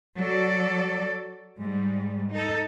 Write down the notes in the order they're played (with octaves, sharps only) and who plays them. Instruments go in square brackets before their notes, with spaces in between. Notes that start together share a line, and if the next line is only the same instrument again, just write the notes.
[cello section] F#3 A4 D5
G#2 G3
D#4 A4